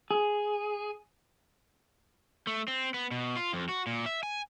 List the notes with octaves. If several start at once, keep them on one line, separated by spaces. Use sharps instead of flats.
G#4
A3
C4
B3
B2
F4
F2
F#4
A#2
E5
G#5